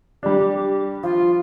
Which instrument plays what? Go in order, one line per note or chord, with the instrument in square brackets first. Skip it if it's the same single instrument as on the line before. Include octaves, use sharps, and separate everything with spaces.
[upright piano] G3 D4 [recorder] G4
[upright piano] F3 [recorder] F4